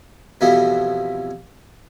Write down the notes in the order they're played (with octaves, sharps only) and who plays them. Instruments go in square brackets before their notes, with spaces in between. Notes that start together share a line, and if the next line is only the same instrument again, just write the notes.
[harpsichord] F2 B2 E3 F3 G3 B3